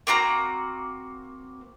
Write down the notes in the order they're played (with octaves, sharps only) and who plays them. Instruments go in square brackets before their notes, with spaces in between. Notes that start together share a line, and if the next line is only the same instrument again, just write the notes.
[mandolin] A#3 C4 F#4 A#5